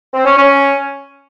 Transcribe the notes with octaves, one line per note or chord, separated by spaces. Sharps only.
C4
C#4
C#4